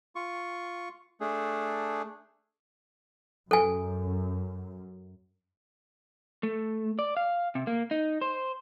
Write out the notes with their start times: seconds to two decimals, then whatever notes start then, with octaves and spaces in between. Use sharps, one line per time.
0.16 F4 C#6
1.21 A3 D4 G#4
3.51 F#2 A4 G#5
6.43 A3
6.99 D5
7.17 F5
7.55 C3
7.67 A#3
7.91 D#4
8.21 C5